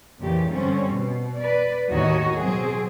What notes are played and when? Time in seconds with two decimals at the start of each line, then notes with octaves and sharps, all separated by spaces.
0.20 F2 A#2 C#3 E3 G4
0.51 G2 D3 G3 C4 C#4
0.88 B2
1.36 B4 D5
1.90 D#2 A2 D#3 F#4 C#5 D#5
2.39 B2 F#3 C4 G#4